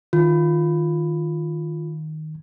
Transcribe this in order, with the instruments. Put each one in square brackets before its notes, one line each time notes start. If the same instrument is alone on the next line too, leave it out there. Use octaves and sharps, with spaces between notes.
[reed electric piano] D#3 [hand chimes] F4